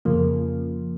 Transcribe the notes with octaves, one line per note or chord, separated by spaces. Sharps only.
F2 C#3 F3 A#3